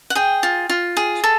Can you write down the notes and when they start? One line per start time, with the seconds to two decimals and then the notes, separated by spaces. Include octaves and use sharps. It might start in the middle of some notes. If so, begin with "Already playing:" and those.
0.10 F#5
0.15 G#4 G5
0.43 F4
0.70 F4
0.97 G#4
1.24 A4